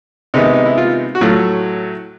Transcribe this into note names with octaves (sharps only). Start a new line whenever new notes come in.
C3 D#3 G#3 B3 D#4
D#4
E4
F4
F#4
A2 F#3 A3 F4